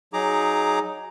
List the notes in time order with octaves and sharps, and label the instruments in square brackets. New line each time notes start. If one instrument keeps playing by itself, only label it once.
[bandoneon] F#3 D#4 G#4 A#5 D6